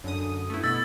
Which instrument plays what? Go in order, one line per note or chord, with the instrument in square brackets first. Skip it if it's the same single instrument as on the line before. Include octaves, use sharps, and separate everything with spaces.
[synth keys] F#2 D3 D#6
A3 B3 E4
[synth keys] B2 E4 [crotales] E6 A6